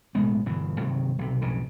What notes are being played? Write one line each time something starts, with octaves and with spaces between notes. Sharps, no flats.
B1 A2 G#3 B3
G1 G2 B2 E3
G2 C3 D#3 F#3
B1 C3
B1 F2 A2 C#3